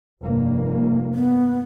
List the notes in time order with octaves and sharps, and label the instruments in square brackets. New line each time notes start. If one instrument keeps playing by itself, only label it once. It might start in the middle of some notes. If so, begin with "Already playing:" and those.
[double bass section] F1 G2 A#3
[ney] B3